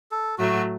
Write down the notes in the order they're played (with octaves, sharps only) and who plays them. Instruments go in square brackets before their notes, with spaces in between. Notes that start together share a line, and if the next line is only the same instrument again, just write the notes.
[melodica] A4
[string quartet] A2 F#3 A3 [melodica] F#4